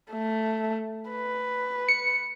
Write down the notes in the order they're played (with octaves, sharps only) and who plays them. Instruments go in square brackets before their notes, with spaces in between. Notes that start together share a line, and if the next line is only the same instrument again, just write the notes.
[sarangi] A3
B4
[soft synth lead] C#7